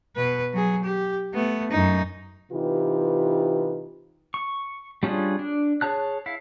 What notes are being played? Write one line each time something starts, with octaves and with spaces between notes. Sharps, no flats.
B2 B4
F#3 G#4
G4
A3 B3
F#2 D#4
C3 E3 D#4 F4 G4 B4
C#6
G3 C#4 D4 F4 G#4
D4
G#4 C#5 A5 F#6
E4 F5